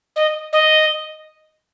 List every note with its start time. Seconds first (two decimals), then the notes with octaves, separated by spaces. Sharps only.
0.16 D#5
0.52 D#5